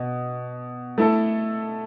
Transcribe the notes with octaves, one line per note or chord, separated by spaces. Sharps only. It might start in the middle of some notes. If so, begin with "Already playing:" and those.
Already playing: B2
A3 E4 A4